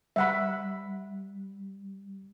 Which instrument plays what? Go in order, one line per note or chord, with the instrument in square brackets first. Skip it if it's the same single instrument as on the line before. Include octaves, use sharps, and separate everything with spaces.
[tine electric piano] G3 [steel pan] E5 F#5 B5